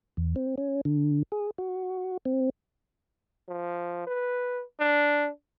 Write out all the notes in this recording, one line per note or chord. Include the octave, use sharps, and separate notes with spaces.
E2
C4
C#4
D3
G#4
F#4
C4
F3
B4
D4